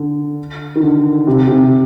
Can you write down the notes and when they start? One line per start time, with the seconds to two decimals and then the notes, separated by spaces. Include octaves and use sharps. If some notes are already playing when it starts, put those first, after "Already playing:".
Already playing: D3
0.76 D#3
0.83 D3
1.27 C3
1.47 C3